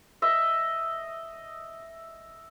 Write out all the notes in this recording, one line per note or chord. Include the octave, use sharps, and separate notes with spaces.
D#5 E5